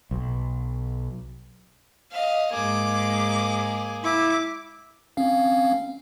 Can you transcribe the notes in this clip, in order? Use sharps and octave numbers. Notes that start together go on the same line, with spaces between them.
B1
D#5 F5
G#2 A#3 G#4 D6
E4 D6
C4 C#4 F5